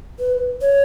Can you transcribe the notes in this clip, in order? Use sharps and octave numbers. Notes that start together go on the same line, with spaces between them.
B4
C#5